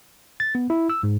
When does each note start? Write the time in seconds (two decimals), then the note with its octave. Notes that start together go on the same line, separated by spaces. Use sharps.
0.40 A6
0.55 B3
0.70 E4
0.90 E6
1.03 G#2